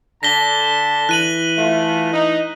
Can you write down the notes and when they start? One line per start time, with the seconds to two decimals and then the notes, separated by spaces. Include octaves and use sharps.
0.23 D3 A5 A#6 B6 G7
1.09 E3 F#6 D#7 F#7
1.57 A3 F4
2.14 D#4